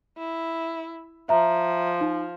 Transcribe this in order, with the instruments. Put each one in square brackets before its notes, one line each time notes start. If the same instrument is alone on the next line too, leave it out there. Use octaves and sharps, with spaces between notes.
[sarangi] E4
[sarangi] F3 [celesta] E5 A#5
[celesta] D#4